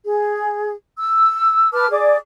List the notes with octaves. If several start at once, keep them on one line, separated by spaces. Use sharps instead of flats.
G#4
E6
B4 A5 D6 F6
G#4 D5 D6